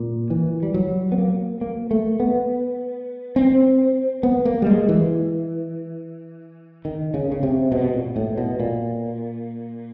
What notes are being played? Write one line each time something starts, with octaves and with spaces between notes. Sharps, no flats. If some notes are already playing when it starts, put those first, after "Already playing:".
Already playing: A#2
E3
G3
F#3
B3
A#3
A#3
A3
B3
C4
B3
A#3
G3
G#3
E3
D#3
C#3
C#3
C3
B2
A#2
A2
B2
A#2